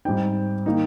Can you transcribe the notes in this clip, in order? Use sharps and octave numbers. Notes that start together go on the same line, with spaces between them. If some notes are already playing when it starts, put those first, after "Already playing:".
G#2 G3 C4 D#4 G5
D#3 A#3 D#4